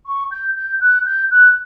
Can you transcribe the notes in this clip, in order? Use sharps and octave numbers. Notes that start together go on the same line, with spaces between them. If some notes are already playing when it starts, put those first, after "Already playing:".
C#6
G6
G6
F#6
G6
F#6